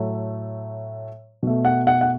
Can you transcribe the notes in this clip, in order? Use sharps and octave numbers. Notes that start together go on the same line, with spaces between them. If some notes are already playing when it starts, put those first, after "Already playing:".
Already playing: A2 F#3 A3
B2 A3
F#5
F#5
F#5